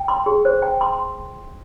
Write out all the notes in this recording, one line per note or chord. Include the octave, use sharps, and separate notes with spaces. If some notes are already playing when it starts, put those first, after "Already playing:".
Already playing: G5
C6
G#4
C5
G5
C6